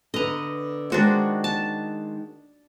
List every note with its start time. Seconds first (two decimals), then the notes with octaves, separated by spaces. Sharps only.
0.14 D3 B3 D#5 A#5
0.92 D#3 G#3 D4 F#4 C5
1.44 A5